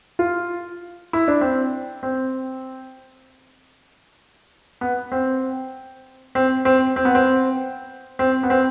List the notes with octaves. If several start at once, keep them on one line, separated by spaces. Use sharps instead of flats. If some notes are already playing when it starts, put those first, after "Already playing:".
F4
E4
D4
C4
C4
B3
C4
C4
C4
C4
B3
C4
C4
B3
C4